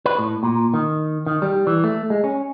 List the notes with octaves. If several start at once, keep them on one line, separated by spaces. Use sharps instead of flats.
B4
A2
A#2
D#3
D#3
G3
E3
A3
G#3
C#4